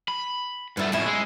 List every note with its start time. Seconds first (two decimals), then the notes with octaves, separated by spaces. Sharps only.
0.08 B5
0.77 G2 A3 B3 E4
0.92 F2 A2 C#4 E4
1.06 G#3